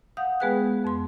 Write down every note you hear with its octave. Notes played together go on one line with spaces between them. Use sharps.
F5 F#5 D#6 G6
G#3 B3 G#4 B4 G5 F#6
F2 C6